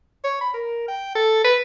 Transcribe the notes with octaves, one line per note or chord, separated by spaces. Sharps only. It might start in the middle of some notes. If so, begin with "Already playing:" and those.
C#5
B5
A#4
G5
A4
B4